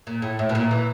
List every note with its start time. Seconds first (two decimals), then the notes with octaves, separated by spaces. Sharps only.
0.07 A#2
0.22 A2
0.39 A2
0.49 B2
0.55 A#2
0.71 E3